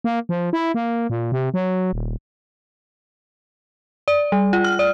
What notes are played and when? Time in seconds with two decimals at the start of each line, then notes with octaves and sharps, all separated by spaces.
0.04 A#3
0.29 F3
0.53 E4
0.74 A#3
1.10 A#2
1.32 C3
1.54 F#3
1.93 D#1
4.08 D5
4.32 G3
4.53 F4
4.64 F6
4.79 D5